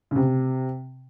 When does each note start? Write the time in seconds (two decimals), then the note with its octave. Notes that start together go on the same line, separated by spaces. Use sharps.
0.11 C#3
0.16 C3